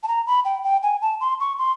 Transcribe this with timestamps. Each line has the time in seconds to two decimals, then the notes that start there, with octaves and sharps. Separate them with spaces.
0.03 A5
0.08 A#5
0.27 B5
0.45 G5
0.64 G5
0.83 G#5
1.02 A5
1.21 C6
1.40 C#6
1.58 C6